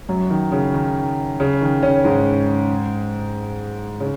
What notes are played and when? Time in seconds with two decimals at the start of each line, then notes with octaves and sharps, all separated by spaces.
0.09 F#2 F#3
0.30 D#3
0.52 C#3
0.74 D#3
1.40 C#3
1.61 D#3
1.83 C#3 C#4
2.04 G#2 G#3
4.00 C#3